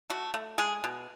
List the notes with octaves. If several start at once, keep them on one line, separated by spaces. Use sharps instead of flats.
A3 F#4
A3
G#3 G#4
B2